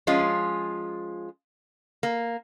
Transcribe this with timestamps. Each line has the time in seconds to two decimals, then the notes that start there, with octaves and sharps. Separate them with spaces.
0.07 F3 G#3 C#4 F4
2.03 A#3